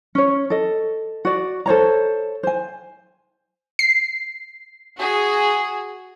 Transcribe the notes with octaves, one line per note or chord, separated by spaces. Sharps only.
C#4 C#5
A4 D#5
F#4 D5
A4 C5 C#5 A#5
C5 G#5
C7
F#4 G#4